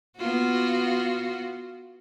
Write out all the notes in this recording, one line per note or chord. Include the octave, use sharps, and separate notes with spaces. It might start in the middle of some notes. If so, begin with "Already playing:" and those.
B3 F4 F#4